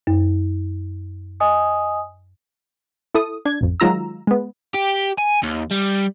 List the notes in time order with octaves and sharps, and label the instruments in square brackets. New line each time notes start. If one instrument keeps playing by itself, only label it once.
[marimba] F#2
[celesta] D#5 G#5 D#6
[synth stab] E4 A4 D#6
D4 G#6
A1 F2
D#3 F#3 G#3 F4 A#5 E6
G#3 B3
[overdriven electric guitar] G4
G#5
D#2
G3